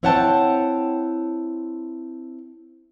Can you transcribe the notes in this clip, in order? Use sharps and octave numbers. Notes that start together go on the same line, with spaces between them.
C4 E4 C#5 F#5 G5 A5